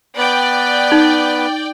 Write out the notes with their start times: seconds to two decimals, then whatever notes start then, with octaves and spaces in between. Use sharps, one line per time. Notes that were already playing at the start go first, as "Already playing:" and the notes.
0.18 B3 B4 D5 G5
0.92 D#4